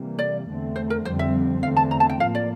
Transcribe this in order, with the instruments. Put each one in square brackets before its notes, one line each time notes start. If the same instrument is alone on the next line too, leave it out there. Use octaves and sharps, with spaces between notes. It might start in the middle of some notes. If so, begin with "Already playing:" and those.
Already playing: [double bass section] C3 E3 G3 A#3
[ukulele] D5
[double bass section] E2 D3 A3 C4
[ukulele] C5
A#4
[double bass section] F2 D3 G3 C4 [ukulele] C5
[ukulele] E5
[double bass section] E2 D3 A3 C4 [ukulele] F5
[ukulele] A5
A#5
A5
G5
[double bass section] A2 F3 A#3 [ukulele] F5
[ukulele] D5